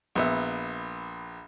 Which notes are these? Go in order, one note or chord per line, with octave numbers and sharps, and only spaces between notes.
A#1 B3 E5